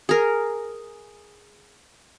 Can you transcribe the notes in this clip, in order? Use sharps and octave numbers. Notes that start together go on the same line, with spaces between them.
G#4 A#4